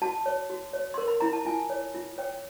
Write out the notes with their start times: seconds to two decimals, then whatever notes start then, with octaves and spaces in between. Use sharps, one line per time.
0.02 F#4 A5
0.26 C#5
0.50 F#4
0.73 C#5
0.94 A#4 C6
1.08 B5
1.21 E4 A#5
1.33 A5
1.45 F4 G#5
1.70 C#5
1.94 F4
2.18 C#5 G5